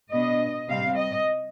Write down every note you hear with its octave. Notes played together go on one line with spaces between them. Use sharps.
B2 B3 D4 D#5
C3 G3 C4 F5
D#5